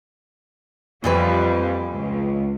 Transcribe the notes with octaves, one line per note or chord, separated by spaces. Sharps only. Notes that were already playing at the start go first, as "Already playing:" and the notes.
F2 A#2 E3 G3 B4
C#2